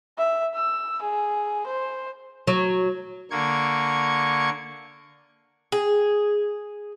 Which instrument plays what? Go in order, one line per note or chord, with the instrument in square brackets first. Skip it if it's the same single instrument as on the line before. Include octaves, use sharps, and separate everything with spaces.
[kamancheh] E5
E6
G#4
C5
[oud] F#3
[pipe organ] D3 A#3 C#6 G#6
[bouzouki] G#4